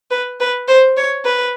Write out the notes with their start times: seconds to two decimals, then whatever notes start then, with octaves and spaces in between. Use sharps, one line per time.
0.11 B4
0.40 B4
0.68 C5
0.97 C#5
1.25 B4